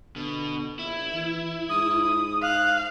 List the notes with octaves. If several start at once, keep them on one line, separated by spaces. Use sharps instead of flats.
B2 D3
A#1 E4
E3
G#2 D#6
F5 F#6